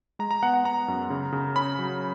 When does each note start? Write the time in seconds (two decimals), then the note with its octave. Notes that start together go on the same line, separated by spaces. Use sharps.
0.19 G#3 A#5
0.31 A#5
0.43 B3 F#5
0.54 F#5
0.64 B3 A#5
0.88 F#2
1.10 C#3
1.33 C#3
1.56 C#4 B5
1.79 F#3